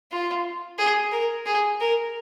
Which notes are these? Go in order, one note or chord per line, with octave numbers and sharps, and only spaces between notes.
F4
G#4
A#4
G#4
A#4